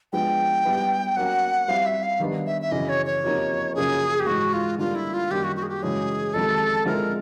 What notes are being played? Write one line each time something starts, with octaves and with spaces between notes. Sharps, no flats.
F3 G#3 B3 D4 G5
G3 B3 E4
F#3 A#3 C#4 F#5
G3 C4 E4 F5
E5
F5
D#3 G3 B3 D4
E5
E5
F#2 C#3 E3 D#5
C#5
C#5
F2 C3 F3 A#3 D#4
F#2 C#3 F3 A#3 C#4 G#4
G4
G#2 E3 G#3 F#4
F4
D3 G3 A#3 D4 F4
E4
F4
F#2 D#3 G3 A#3 G4
F#4
F#4
G#4
G4
F#2 C#3 E3 G#3 C#4 G#4
F2 C3 D#3 G#3 A4
D3 F3 G#3 C4 E4 A#4